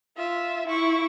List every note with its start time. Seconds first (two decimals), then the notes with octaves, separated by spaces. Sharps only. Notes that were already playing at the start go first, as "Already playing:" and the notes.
0.17 F4 E5
0.67 E4 C#6